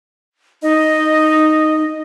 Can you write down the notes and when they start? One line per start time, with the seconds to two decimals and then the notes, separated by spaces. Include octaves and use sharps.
0.63 D#4 D#5